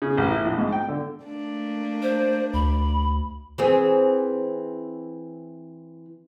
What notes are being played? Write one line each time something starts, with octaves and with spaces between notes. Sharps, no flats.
C#3
A1
E4
A#1
G#2
G5
D3
A3 A#3 D4
C5
D2 B5
E3 C4 G#4